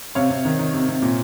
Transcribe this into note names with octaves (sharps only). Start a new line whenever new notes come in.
C3 C#5 F5
C3
D#3
D#3
C3
C3
A#2